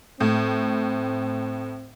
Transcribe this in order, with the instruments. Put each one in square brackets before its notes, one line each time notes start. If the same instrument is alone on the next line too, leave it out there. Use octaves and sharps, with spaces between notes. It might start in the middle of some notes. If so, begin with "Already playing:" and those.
[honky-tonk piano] A2 [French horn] C4